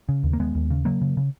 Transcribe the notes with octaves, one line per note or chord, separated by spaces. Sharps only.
C#3
D#2
A#3
D#2 G#3 B3
D#2
C#3
C#3 F#3 A#3
C#3
C#3